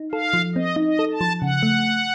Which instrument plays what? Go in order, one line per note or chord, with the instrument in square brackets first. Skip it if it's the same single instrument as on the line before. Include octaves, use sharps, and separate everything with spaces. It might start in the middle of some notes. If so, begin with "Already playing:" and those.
Already playing: [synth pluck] D#4
[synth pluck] A4 [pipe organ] F5
[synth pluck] F3
[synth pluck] C4 [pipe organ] D#5
[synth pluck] D#4
[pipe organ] D#5
[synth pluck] A4
[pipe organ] A5
[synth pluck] F3
[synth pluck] C#3 [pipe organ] F#5
[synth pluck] A3